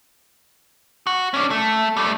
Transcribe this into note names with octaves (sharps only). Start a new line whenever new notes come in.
F#4
C#4 D4
A3
G3 A3